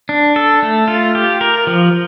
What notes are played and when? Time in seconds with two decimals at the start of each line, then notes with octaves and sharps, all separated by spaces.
0.09 D4
0.36 A4
0.63 A3
0.88 F4
1.15 G4
1.41 A#4
1.67 F3